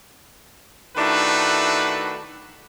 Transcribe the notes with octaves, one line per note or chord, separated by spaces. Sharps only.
D#3 A3 D4 E4 F#4 B4